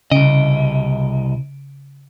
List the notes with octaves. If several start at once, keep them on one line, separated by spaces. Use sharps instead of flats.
C2 C#3 D#5 D7